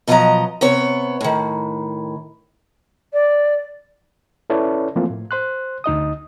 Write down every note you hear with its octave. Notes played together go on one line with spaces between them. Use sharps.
B2 F3 F#3 D5 D#5 A#5
C3 B3 C#5
A2 D#3
D5
C#4 E4 A4 B4 C#5 D5
E3 F3 A3 A#3 C4 F4
A2
C5 C6 F#6
D2 D#4 D#5 D#6